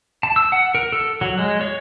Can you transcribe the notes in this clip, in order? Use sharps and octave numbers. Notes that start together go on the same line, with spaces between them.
A5
E6
F#5
A#4
A4
F#3
G#3
C#5